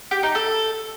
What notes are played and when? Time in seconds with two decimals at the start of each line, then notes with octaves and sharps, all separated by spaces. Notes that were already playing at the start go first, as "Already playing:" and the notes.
0.11 G4
0.23 D#4
0.35 A4